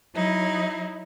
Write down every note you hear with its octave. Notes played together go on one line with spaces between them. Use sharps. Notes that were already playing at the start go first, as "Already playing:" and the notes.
F#3 D#4 E4